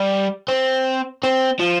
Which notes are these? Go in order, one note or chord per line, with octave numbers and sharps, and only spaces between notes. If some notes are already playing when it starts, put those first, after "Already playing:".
Already playing: G3
C4
C4
F3